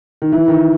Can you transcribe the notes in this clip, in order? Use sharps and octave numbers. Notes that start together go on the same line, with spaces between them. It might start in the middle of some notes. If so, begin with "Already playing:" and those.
D#3
E3
D#3